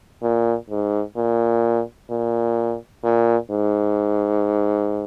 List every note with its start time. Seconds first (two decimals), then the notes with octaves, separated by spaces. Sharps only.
0.22 A#2
0.70 G#2
1.16 A#2
2.10 A#2
3.04 A#2
3.51 G#2